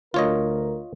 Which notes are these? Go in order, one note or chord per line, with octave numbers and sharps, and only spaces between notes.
D2 F4 A#4 C#5 D#5